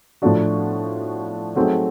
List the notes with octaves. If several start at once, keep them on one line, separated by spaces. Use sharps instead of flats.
A2 F3 A3 D4 F#4
F#3 A3 C4 D#4 G#4